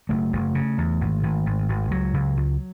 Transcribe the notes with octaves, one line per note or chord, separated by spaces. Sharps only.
F#1 A3
F#1
C#3
E2
G#1
G#1
G#1
G#1
C#2 F#3
C#2
C#2